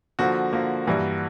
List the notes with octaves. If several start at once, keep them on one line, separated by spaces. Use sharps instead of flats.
D3 F3 A#3 F#4
D3 F3 A#3
G2 E3 G3 A#3